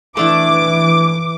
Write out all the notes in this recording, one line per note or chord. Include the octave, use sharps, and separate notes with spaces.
E3 A3 D4 E4 D6